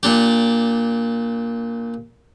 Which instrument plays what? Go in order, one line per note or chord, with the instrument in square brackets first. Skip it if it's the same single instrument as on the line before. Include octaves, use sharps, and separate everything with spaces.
[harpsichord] A#2 D4 G4